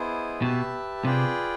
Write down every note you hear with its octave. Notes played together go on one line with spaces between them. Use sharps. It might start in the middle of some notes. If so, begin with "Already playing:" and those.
Already playing: B3 E4 G#4 C5 D#5
B2 G4 B4 E5 A5
C3 F4 G#4 B4 D5 G5